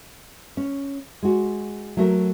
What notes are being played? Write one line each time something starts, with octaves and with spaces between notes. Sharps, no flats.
C#4
G#3 F#4
F#3 A3 A#4